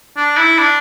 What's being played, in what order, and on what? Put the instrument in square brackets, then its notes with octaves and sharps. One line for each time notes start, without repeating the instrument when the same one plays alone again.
[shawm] D4
E4
D4